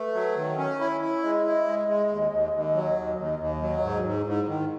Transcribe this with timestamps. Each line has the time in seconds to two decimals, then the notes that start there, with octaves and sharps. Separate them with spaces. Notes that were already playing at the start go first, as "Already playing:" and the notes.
Already playing: A3 B4
0.14 F#3
0.36 D#3 C#5
0.58 C#4
0.80 E4
1.01 E4
1.23 G#3 D#5
1.45 E4
1.66 G#3
1.88 G#3
2.10 D#2
2.32 D#2
2.53 D#2
2.75 F#3
2.96 D#2
3.18 D#2
3.39 D#2
3.61 F#3
3.72 D#5
3.83 G#2 C#5
4.04 G#2 D#4
4.25 G#2 E4
4.48 D#3 D#4